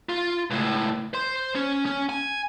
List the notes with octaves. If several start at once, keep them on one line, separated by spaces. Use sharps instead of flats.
F4
C#2 A2
C5 C6
C#4
C#4
G#5